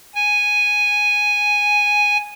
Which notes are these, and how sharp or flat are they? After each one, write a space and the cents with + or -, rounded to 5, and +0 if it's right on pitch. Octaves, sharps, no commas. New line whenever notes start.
G#5 -5